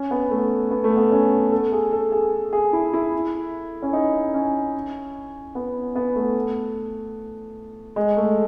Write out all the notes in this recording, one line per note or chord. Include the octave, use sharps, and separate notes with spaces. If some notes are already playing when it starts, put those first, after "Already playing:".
Already playing: C#4
B3
A3
B3
A3
B3
C#4
A4
G#4
A4
G#4
G#4
E4
E4
C#4
D#4
C#4
B3
B3
A3
G#3
A3